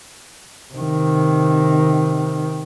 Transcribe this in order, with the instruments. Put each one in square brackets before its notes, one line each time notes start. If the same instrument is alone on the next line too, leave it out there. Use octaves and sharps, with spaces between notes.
[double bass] C3 D#3